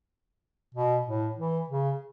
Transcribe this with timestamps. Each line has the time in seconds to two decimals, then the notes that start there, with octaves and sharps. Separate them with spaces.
0.75 B2
1.06 A2
1.37 E3
1.68 C#3